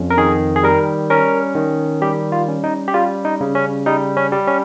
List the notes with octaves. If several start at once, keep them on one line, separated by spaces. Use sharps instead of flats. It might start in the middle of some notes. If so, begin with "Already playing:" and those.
Already playing: F2 C#4
A#4
D#3 G#4
G#4
G3 A#4
C#4 A#4
D#3
G3 G4
F4
C#4
D#4
G4
G3 F4
D#4
C#3
C#4
G3 D#4
C#4
G3
C#4